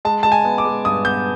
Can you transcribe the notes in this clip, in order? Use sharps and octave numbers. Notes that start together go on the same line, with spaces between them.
G#3 A5
G#3 A5
G#5
B3
D6
G#3
G2 D#6
B3 G6